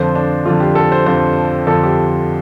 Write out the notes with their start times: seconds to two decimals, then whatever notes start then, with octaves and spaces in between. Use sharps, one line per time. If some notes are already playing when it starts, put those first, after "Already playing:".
Already playing: F2 D3 F3 C5
0.15 D4
0.45 F2 D3 F3 F4
0.60 G4
0.75 A4
0.92 C5
1.06 F2 D3 F3 C5
1.67 F2 D3 F3 A4
1.83 G4